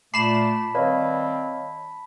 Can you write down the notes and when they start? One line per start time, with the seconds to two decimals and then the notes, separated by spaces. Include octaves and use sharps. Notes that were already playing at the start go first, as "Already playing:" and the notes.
0.14 A#2 A3 A5 B5 D6 B6 C7 E7
0.75 D#3 G3 C4 B4 C#5 D#5 F5